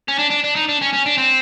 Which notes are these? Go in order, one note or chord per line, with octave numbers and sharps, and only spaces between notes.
C#4
D4
D4
D4
D#4
D4
C#4
C#4
D4
C4